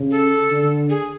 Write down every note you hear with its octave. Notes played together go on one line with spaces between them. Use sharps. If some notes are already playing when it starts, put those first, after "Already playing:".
Already playing: C#3
A4
D3
G#4